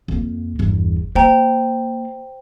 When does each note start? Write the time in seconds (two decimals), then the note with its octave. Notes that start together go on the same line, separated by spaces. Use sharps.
0.08 F2 A#3
0.59 G1 E2
1.15 A#3 C5 G5 A#5